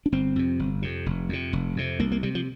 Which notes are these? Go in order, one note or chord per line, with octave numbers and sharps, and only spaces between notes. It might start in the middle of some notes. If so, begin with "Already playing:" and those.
D4
G1 C4
F2 C3
G1
F2 C3
F1
F2 C3
F1
F2 C3
C2 A#3
A#3
C3 G3
F3